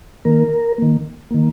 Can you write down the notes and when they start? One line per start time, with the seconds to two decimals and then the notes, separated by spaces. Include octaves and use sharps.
0.25 D#3 A#3 A#4
0.78 D#3 A#3
1.31 D#3 A#3